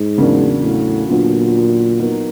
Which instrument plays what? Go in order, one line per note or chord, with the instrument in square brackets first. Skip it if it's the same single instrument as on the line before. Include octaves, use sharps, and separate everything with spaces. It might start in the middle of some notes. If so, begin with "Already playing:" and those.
Already playing: [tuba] G#2
[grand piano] E2 C#3 F#3 A#3 D4
[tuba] A2
[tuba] A#2 [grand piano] D3 F#3 B3 D4 F4
[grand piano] F#3 B3 D#4 F#4 A#4